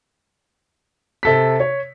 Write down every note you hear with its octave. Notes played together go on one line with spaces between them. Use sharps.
C3 A4 B6
C#5